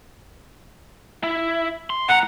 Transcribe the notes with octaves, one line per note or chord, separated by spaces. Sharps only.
E4
C6
A2 F#5 A#5